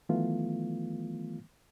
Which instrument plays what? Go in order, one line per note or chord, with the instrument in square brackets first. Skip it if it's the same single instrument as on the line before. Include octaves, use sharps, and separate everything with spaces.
[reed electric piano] D#3 E3 F#3 A3 B3 F4